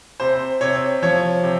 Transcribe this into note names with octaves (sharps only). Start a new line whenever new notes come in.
C3 C5
C3 C#5
F3 C#5
C3